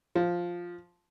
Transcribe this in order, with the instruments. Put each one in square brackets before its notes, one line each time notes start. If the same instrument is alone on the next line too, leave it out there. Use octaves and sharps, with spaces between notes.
[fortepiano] F3